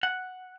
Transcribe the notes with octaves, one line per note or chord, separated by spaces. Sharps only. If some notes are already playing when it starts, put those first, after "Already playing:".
F#5